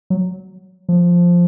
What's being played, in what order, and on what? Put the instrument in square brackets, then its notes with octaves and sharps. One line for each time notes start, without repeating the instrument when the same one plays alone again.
[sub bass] F#3
F3